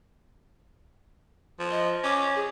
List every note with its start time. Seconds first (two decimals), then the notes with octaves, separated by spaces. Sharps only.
1.59 F3
1.71 D#5
2.03 C#4 D6
2.36 G#4